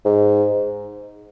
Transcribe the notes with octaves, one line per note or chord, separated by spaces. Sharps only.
G#2